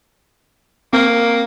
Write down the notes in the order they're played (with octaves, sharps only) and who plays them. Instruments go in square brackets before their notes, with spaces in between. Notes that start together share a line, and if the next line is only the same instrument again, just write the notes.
[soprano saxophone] A#3 [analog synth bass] C4